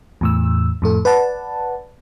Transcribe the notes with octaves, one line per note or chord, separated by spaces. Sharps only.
E2 A2 E6
F2 A2 A4
B4 D5 F#5 A5